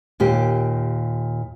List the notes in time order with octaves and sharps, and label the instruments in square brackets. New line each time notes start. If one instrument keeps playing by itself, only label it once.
[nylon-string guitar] D#2 A#2 G4